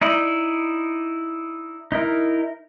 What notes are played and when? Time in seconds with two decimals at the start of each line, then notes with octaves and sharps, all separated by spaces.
0.02 D#4 E4 D5
1.92 D#4 E4 A#4